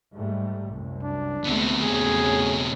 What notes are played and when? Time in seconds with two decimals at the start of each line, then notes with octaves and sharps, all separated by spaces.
0.14 G#2 G3 A3
0.71 C2 F#2
1.03 D4
1.44 C#2 B2 D3 A3 C4
1.82 E2 A3 C#4 G#4